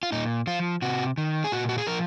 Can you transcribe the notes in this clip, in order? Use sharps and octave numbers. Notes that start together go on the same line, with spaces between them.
F4
A#2 D#4
F3 F4
C3 F#4
D#3
G#4
A#2 F#4
F#4
G#4
F3 A#4